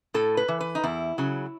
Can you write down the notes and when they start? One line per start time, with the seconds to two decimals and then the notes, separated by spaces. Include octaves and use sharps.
0.14 A2 A4
0.37 B4
0.48 E3
0.60 B4
0.75 D#4
0.84 E2 E4
1.18 C#3 F#3